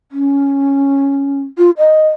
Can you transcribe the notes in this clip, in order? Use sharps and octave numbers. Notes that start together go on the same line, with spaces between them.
C#4
F4
D#5